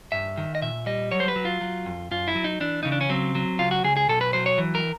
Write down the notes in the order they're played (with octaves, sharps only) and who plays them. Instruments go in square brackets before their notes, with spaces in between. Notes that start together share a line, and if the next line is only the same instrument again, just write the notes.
[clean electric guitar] G2 E5
D#3
D#5
A#2 E5
G3 D#5
F#3 C#5
C5
B4
F#3
F4
F#3
F2
F#2 F4
E4
F#3
D#4
E3 D4
C#3 D#4
D4
C#4
F#3 C4
F#3
C#2 F4
F#4
C#2 G#4
G#4
B1 A4
B4
F#3 C5
C#5
E3
A#4